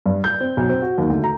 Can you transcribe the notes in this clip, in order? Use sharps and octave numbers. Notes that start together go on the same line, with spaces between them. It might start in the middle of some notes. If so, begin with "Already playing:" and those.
G2
G6
C4
B1
C4
F#4
D#2
D2
A#5